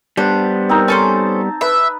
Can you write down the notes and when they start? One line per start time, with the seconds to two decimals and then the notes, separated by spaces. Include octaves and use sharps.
0.17 G3 B3 D4 C5
0.69 C4 D#4 A#4
0.88 C#4 A4 C5 A5
1.61 B4 E5